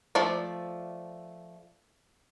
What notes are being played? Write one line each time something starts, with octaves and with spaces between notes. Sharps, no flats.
F3 A3 D5